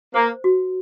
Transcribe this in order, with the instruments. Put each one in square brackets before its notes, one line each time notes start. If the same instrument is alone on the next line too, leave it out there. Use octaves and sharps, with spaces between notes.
[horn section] A#3 [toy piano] C5
[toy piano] F#4